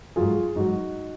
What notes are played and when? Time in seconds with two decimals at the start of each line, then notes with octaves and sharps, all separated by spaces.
0.16 G#2 F#3 F4 G#4
0.56 G#2 F#3 D#4 F#4